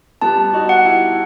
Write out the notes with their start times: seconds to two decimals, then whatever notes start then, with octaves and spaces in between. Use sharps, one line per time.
0.22 G3 B3 A5
0.53 D#4 F#4
0.69 F#5
0.85 E4 G4